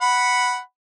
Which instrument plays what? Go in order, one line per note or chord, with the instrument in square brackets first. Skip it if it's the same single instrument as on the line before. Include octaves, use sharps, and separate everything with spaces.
[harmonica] F#5 B5